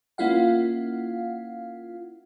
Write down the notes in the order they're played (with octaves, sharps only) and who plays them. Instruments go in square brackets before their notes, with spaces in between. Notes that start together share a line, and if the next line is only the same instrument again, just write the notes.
[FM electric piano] A#3 C#4 E4 F4 F5 F#5